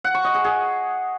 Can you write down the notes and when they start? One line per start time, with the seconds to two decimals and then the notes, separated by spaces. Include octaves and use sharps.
0.04 F#5
0.14 C#6
0.24 D#5
0.34 G#4
0.44 G#4